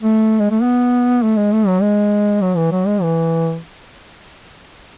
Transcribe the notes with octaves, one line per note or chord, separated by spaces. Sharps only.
A3
G#3
A3
B3
A3
G#3
A3
F#3
G#3
F#3
E3
F#3
G#3
E3